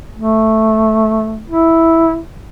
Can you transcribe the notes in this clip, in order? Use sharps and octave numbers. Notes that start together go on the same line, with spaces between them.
A3
E4